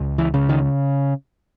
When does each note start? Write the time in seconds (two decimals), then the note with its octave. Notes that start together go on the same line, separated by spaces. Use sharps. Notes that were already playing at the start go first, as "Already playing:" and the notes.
Already playing: C#2
0.18 E3
0.34 C#3
0.49 D#3